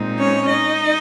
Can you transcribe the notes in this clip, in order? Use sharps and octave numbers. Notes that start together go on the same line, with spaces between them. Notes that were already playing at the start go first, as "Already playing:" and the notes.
Already playing: A#2 G#3 C4 D#4
C#4 C#5
D#4 D#5